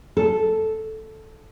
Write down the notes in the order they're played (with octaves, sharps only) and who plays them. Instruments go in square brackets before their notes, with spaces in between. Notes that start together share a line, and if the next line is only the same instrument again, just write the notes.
[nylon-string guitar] A4